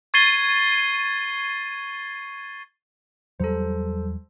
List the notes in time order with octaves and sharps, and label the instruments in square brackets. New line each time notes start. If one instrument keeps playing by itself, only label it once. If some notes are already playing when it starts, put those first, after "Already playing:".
[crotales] C#6 G#6 A6 C7 D#7 G7
[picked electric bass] E2 F#3 G3 [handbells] A4 C5